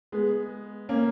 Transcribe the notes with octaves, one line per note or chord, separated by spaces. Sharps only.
G#3 B3
A#3 C#4